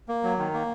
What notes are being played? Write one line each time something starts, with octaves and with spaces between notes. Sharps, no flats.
A#3
F#3
D#3
A#3